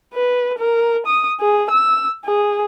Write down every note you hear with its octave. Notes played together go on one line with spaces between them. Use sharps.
B4
A#4
D#6
G#4
E6
G#4